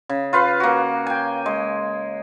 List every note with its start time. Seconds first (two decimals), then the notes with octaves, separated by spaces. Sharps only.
0.09 C#3
0.33 F4 B4 F5
0.60 A#3 F#4
1.07 G5 G#5
1.46 G#3